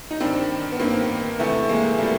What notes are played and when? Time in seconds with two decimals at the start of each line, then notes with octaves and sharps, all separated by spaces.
0.11 D#4
0.20 G2 D#3 C4 D4
0.72 B3
0.79 G2 D#3 A#3 C4
1.39 E2 C3 E3 A3 B3
1.69 G#3 A#3
1.98 C3 E3 G3 A3